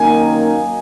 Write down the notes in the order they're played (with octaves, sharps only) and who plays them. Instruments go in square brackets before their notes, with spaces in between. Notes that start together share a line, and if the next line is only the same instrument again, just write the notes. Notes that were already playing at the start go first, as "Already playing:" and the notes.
Already playing: [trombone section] F#2 D#3 A#3 D#4 [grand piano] G#5